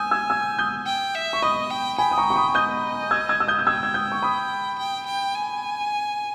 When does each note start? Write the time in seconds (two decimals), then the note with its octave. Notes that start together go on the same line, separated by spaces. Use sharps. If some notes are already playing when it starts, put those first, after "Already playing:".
Already playing: G#5 D#6 E6 G6
0.11 E6 G#6
0.30 E6 G#6
0.59 D#6 G6
0.87 G5
1.15 E5
1.33 C#6
1.42 D#5 B5 D#6
1.70 G5
1.98 G5 G#5 B5
2.11 D#6
2.18 A#5 C#6
2.30 C#6
2.36 B5 D#6
2.55 D#5 D#6 G6
3.11 E6 G#6
3.29 E6 G#6
3.40 E6
3.48 D#6 G6
3.59 G6
3.67 G5 E6 G#6
3.83 G#6
3.94 D#6 G6
4.12 C#6
4.22 B5 D#6
4.79 G5
5.07 G5
5.35 G#5